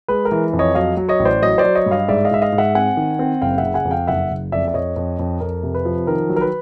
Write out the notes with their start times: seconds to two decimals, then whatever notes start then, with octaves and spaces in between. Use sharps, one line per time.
0.08 G#3 B4
0.25 A#4
0.32 E3
0.53 F2
0.59 C#5 D#5
0.75 F#3 D#5 F5
0.97 F#3
1.09 C#5 D#5
1.19 A1
1.25 C5 D5
1.42 F#3 C#5 D#5
1.58 C5 D5
1.64 F#3
1.75 C#5 D#5
1.86 G2
1.91 D#5 F5
2.08 G#2 D5 E5
2.25 D#5 F5
2.31 G#2 E5
2.42 D#5 F5
2.52 G#2
2.58 E5 F#5
2.75 C4 F#5 G#5
2.97 D#3
3.19 C4
3.42 F#1 F5 G5
3.58 E5 F#5
3.63 C#3
3.74 F#5 G#5
3.85 F2
3.91 F5 G5
4.07 F#1 E5 F#5
4.30 F#1
4.52 F2 D5 E5
4.68 E5
4.74 F2 C#5 D#5
4.96 F2
5.19 F2
5.40 F2 A#4
5.63 C3
5.74 B4
5.85 F3
6.07 D#3 A#4
6.29 F#3
6.36 A#4
6.41 B4